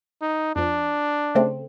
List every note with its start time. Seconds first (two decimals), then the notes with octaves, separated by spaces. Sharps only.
0.22 D#4
0.56 F2 F3 D4
1.35 C#3 A3 C4